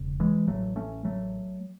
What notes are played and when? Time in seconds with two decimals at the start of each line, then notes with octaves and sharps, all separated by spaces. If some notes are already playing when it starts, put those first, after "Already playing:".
Already playing: E1 C#3
0.20 E3 G#3
0.48 A1 A2 F#3 A3
0.76 A3 C#4
1.05 F#3 A3